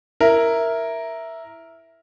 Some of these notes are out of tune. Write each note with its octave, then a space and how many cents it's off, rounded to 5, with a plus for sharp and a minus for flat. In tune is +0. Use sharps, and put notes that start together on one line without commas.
E4 +0 A#4 +0